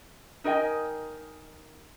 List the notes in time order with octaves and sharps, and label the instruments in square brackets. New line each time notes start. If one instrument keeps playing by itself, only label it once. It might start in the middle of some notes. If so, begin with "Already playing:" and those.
[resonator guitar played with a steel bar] D#4 A#4 D#5 G5 G#5